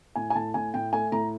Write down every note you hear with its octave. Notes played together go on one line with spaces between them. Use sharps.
A2 G#5
G#5
A2 A5
A2 G#5
A2 G5
A3 G#5
A2 A#5